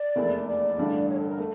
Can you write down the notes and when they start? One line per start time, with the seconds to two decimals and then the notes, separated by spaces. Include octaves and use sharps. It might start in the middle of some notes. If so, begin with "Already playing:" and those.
Already playing: D5
0.16 F1 E2 E3 A#3 E4
0.47 D5
0.77 A1 G2 D3
1.08 C#5
1.18 A4
1.29 A#4
1.39 A3